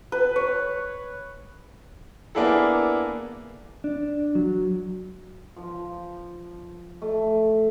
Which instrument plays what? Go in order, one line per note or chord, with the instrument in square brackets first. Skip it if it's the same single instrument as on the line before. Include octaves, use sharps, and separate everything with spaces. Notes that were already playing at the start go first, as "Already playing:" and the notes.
[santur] B4
C#5
[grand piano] A#3 B3 D4 E4 G#4 A4
[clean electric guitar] D4
F#3
[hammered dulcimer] F3
A3